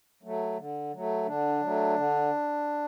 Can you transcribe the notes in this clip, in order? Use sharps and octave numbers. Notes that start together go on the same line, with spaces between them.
F#3 A3
D3
F#3 A3
D3 D4
F#3 A3
D3